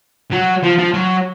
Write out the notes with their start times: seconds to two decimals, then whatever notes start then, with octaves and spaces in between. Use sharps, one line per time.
0.31 F#3
0.63 F3
0.78 F3
0.94 F#3